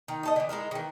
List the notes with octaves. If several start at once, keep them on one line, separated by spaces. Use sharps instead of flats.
D#3 D#4
D#4 A4 D#5
D3 E3
G#3 D#4 E4 A#4
D#3 E3